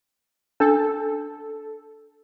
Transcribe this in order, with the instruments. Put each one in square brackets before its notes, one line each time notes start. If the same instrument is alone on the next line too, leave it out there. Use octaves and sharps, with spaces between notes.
[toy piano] D4 [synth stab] A4